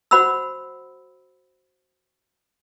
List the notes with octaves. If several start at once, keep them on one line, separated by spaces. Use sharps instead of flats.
F#4 C5 F#5 B5 C6 E6